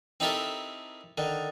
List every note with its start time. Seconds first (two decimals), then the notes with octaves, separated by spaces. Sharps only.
0.20 C4 D#4 E4 G4 A4 A#4
1.18 D3 D#3